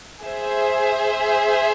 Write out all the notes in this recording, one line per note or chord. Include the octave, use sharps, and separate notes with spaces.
G#4 C5 E5